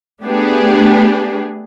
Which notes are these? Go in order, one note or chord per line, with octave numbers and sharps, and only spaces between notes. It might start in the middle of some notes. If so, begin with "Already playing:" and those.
A3 B3 D4 G4 G#4